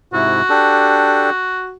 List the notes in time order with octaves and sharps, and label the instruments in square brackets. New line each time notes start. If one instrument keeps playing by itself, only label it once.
[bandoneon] G#2 C3 E4 [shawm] F#4
[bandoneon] D4 G4 A4